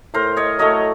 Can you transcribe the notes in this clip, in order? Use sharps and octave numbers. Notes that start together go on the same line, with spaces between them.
A2 A#4 C5
C#5 D#5
F#3 A3 C#5 D#5